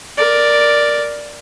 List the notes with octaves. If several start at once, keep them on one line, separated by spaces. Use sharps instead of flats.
A#4 D5